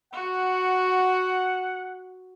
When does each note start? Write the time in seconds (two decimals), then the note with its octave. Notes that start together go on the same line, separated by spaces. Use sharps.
0.13 F#4 F#5